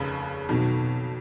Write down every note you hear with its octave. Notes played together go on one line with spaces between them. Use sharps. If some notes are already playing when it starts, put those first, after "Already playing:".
Already playing: F1 D#2 C#3
F2 B2 D#3 F#3